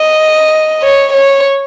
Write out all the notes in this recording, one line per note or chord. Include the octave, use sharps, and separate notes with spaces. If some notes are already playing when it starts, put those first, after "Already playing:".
Already playing: D#5
C#5
C#5